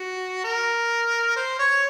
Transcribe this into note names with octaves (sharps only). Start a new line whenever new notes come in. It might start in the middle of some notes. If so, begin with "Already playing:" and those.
Already playing: F#4
A#4
C5
C#5